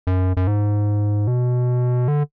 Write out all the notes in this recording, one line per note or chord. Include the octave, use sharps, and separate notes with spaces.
F#2
F#2
G#2
B2
D3